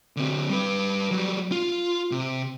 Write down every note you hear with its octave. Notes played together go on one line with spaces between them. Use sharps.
D3 C4
G3 B4
F#3 G3
F4
C3